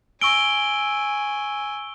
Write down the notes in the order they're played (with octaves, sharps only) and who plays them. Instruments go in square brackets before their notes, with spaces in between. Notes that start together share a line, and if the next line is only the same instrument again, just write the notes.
[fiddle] G#5 [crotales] C#6 E6 G7 [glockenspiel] D7